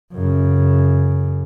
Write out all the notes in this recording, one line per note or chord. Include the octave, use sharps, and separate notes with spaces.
F#2 C#3